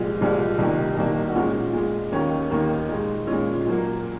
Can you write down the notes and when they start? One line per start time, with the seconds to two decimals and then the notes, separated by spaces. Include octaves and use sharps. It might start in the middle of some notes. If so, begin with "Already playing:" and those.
Already playing: C2 A#2 F3 G#3
0.20 C2 A#2 F3 G#3
0.58 C2 C3 D#3 A#3
0.97 C2 C3 D#3 A#3
1.29 F#4
1.35 A#2 G#3 C#4 F4
1.73 A#2 G#3
2.12 D#2 D#3 A#3 C#4
2.51 D#2 D#3 A#3
2.89 A#2 G#3
3.27 A#2 G#3 C#4 F4
3.66 A#2 F#3 A#3